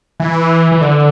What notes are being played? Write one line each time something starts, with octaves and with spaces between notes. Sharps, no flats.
E3
E3
D3